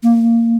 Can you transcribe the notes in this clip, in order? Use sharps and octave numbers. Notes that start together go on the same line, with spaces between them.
A#3